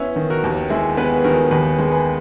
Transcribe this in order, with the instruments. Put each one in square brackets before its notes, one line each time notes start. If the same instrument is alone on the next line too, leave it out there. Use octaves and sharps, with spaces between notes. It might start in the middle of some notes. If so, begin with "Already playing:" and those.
Already playing: [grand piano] B3 [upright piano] C#4 E4
[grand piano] D#3
[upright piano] F#4 A#4
[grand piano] D#2
[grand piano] G#3 [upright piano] E4 G#4
[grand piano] B3 [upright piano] G#4 B4
[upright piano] G#4
[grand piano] D#3 [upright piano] F#4 A#4
[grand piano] D#2 [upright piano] G#4 B4
[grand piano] G#3
[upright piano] G#4 B4